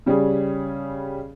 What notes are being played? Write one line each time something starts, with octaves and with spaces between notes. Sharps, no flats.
C#3 G3 C#4 G#4